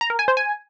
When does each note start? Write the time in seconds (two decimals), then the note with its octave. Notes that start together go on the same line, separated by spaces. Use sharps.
0.01 A#5
0.10 A#4
0.19 G#5
0.28 C5
0.37 G#5